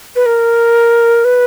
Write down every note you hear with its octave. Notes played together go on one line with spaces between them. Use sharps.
B4
A#4
B4